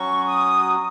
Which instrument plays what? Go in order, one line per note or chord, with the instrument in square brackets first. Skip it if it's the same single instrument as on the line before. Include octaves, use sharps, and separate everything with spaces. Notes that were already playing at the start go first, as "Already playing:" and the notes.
Already playing: [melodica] F#3 C#4 F#4 [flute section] C#6
[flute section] D#6